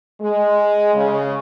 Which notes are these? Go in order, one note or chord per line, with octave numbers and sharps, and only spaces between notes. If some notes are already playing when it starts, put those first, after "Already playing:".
G#3
C#3